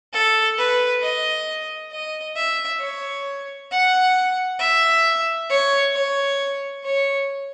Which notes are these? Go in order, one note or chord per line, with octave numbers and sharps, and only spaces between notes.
A4
B4
D#5
D#5
E5
C#5
F#5
E5
C#5
C#5
C#5